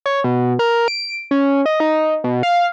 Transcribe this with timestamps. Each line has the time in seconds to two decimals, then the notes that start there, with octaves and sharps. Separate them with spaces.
0.06 C#5
0.24 B2
0.59 A#4
0.88 D7
1.31 C#4
1.66 D#5
1.80 D#4
2.24 B2
2.43 F5